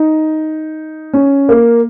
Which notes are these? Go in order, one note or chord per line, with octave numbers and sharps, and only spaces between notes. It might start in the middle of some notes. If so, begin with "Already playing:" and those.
Already playing: D#4
C#4
A#3